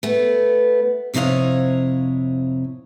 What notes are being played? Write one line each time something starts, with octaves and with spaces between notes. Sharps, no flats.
A3 B3
F2 C3 E4 C#5 D#5 F5